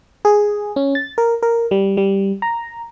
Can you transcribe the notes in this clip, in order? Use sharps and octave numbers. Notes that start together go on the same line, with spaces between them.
G#4
C#4
A6
A#4
A#4
G3
G3
A#5